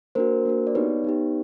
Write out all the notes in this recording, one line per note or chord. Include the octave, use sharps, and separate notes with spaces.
A#3 D4 F#4 A#4 C5
A#3 D4 F#4
D5
B3 D#4 G4 B4 C#5
B3 D#4 G4